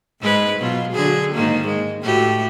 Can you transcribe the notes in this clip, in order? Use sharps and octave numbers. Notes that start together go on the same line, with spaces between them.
G#2 G#3 B4
B2 F#3 F4
D3 F#3 G#4
G#2 D#3 A#3
G#3
A2 F#4 G4